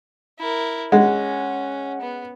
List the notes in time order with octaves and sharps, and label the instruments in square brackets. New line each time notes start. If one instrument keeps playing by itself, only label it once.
[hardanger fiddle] E4 A#4
[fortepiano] G#3 [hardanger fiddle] C#4 [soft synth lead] F#5
[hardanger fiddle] B3